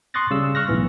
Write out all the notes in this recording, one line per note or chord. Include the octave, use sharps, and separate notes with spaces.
C6 C#6 D#6 F#6 A6 A#6
C#3 G3 E6
C#6 F6 F#6 A#6
B1 A2 E3 B3 A#6